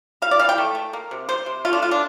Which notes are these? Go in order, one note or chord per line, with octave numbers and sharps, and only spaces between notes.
E3 F5
D5
E3 F5
G5
A3
A3
A#3
C3
G3 C5
C3
A3 F4
D4
D3 F4
D4